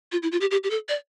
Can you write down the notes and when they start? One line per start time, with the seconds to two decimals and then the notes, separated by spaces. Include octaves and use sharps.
0.12 F4
0.23 E4
0.32 F4
0.41 G4
0.51 G4
0.64 G4
0.70 A4
0.89 D5